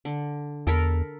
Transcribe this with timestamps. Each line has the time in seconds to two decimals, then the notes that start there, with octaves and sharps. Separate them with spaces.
0.05 D3
0.67 E2 A4 A#4 B5